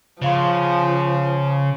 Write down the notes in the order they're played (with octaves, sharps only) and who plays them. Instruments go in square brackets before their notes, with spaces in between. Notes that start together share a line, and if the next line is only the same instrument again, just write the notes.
[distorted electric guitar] C#3 [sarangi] F3 [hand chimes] C5 F5 C6